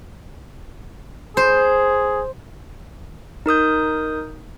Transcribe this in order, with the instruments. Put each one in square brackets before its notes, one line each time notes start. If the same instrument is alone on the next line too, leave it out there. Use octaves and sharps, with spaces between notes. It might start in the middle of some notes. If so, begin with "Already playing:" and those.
[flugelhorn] G#4 [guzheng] C5
[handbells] D#4 A#4 D#6 G6